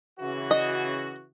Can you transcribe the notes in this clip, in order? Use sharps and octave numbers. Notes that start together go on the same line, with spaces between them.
C#3 E3 F#4
D#5